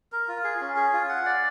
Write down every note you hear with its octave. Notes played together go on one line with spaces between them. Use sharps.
A#4
F4
G#4
C#4
G#4
F4
F#5
D5